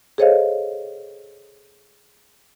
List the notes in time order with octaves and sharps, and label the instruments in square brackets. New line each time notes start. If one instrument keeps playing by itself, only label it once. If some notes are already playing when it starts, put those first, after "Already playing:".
[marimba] G#4 A4 C5 C#5 D#5 F5